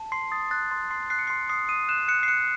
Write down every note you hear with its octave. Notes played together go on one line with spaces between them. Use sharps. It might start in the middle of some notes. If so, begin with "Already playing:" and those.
Already playing: A5
C6 C7
D#6 A6
F#6 A6
C6 A6
C6 C7
F#6 C7
C#7
C6 C7
D#6 C7
D#6 D#7
F#6 E7
F#6 C#7
C7
F#6 C#7